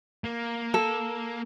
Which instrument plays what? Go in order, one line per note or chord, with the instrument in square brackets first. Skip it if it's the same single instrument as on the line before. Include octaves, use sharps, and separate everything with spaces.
[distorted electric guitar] A#3
[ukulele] A4